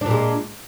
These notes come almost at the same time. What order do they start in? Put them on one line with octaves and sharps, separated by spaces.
D4 A#2 G#3